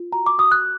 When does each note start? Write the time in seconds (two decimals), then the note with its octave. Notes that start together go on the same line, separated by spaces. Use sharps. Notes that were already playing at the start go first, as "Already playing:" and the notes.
Already playing: F4
0.12 F#4 A#5
0.26 D6
0.38 F#4 D#6
0.52 F#6